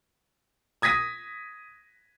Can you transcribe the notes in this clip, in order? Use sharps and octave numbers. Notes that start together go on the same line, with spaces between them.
D#6 G#6 A#6 B6 D#7